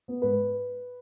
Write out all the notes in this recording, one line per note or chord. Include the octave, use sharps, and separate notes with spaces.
B3
G#2 B4